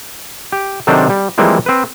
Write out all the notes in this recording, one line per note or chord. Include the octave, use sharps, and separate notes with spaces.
G4
C3 D#3 F#3 C4 D4 A4
G3
E3 F3 G3 G#3 A#3 C4
C4 B4